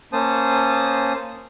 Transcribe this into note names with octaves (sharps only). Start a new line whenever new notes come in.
A#3 C#4 C5 A5 D#6